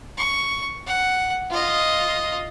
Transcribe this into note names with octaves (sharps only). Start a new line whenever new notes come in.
C#6
F#5
F4 D#5